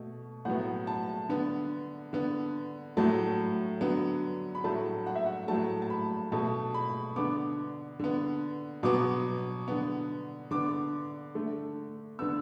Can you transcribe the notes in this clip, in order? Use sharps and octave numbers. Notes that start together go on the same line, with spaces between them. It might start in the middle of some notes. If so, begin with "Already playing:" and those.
Already playing: B2 A3
A2 F#3 B3 F#5
A5
D3 B3
D3 B3
A2 F#3 A3 A5
D3 F#3 B3
B5
A2 F#3 A3 A5
F#5
E5
F#5
A2 F#3 A3 A5
A5
B5
B2 A3 A5
B5
D3 B3 D6
D3 B3
B2 F#3 B3 D6
D3 B3
D3 B3 D6
D3 A3
D3 B3 E6